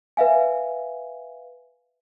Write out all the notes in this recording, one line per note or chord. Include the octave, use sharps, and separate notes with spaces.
B4 E5 F5 G#5